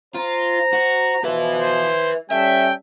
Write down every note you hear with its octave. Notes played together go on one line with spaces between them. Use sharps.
F4 C5 A#5
F#4
B2 F3 B4 E5
C5
G3 C#4 A4 E5 G5